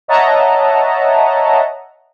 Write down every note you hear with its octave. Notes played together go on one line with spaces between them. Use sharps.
C#5 D#5 E5 F#5 A5 A#5